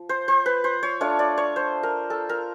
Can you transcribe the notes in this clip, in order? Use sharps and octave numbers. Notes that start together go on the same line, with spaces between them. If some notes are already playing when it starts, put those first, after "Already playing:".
Already playing: F3
C5
C5
B4
C5
C#5
A3 D4 F4 C#5
D5
C#5
C5
A#4
A4
A#4